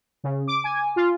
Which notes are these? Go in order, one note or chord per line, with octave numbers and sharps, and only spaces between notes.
C#3
D6
G#5
F4